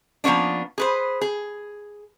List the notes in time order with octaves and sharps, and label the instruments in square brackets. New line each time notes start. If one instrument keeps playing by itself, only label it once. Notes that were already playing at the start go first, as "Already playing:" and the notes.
[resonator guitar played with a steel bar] F3 A#3 B3 C#4 D4
G#4 B4 C5
G#4